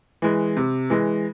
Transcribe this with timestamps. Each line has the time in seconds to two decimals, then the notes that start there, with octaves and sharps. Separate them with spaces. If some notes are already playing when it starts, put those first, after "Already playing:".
0.22 E3 G#3
0.57 C3
0.90 E3 G#3